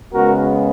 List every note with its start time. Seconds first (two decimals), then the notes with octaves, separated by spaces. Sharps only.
0.12 C#3 G#3 B3 F#4 A#4